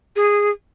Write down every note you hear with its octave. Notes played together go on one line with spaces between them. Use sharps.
G#4